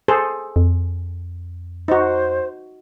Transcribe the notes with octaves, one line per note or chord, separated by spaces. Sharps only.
G#4 A4 C5
F2
D#4 F#4 C5